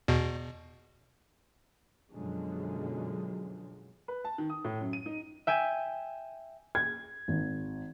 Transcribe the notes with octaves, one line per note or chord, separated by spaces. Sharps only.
E2 B2
F#2 B2 D3 F3 F#3 G#3
B4
A5
D#3
D#6
A2
F#2
D#7
D#4
E5 G5 G#5
G#6
G#1